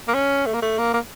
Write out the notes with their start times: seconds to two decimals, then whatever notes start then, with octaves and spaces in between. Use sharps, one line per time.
0.08 A#3
0.14 C#4
0.46 A3
0.54 A#3
0.62 A3
0.78 A#3
0.94 A#3